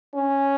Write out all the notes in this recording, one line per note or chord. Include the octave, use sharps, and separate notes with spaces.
C#4